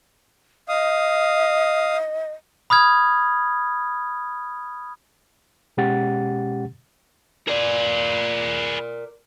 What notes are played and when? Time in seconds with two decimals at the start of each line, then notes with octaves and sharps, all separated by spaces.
0.68 D#5 F5 D#6
2.70 B5 D#6 F6 G#6
5.77 B2 G#3 C#4 G4 F#5 A6
7.48 G#4 A#4 B4 D5